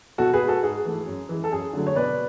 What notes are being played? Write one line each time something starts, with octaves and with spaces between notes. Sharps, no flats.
B2 F#4 A4
G#4 B4
G#3
F#4 A4
G#2 G#4
E3 A3
F#2
E3 G#3
A4
F#2 G#4
D3 F#3 A3
C#5
B2 B4 D5